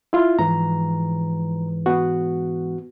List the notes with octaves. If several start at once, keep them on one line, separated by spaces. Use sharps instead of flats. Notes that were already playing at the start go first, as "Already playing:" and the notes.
E4 F4
G#2 E3 F3 A#5
B3 F#4